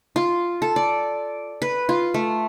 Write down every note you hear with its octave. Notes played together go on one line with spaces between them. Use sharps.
F4
A4
D5
B4
F4
A3